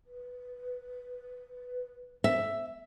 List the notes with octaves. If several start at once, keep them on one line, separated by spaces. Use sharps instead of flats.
B4
E5